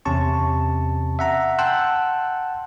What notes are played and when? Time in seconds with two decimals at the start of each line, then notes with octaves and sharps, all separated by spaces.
0.05 E2 C3 C#4 A5 C#6
1.19 E5 F#5 A#5
1.59 F#5 G5 A5 C6 E6 F#6